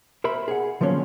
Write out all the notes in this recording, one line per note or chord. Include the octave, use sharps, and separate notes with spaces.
A#4 C5 E5 B5
G#4 F#5
D3 F3 F#3 A#3 C#4